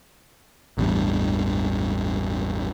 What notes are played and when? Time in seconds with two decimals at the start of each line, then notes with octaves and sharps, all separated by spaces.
0.78 A1 E2 G2